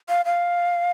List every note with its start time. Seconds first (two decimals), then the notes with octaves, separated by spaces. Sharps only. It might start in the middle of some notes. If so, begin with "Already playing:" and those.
0.09 F5
0.25 F5